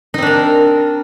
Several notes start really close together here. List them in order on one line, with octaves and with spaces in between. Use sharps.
D#4 C4 D4 A#4